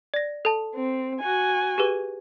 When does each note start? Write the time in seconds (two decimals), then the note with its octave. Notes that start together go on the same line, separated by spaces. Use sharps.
0.14 D5 A#6
0.45 A4 A5
0.75 C4
1.20 F#4 G#5
1.78 G4 G#4 B4